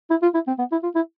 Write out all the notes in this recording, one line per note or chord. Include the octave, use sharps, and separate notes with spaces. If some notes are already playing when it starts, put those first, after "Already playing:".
E4
F4
E4
C4
B3
E4
F4
E4